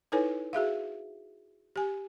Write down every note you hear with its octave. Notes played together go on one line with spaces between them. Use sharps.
D#4 E4 A4 B4 C#5 G#5
F#4 G#4 E5 F5
G4 G#5